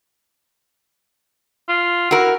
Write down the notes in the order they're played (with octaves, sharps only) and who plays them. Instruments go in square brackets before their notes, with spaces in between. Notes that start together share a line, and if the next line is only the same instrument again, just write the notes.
[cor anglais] F4
[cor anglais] E4 [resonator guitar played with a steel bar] F#4 A#4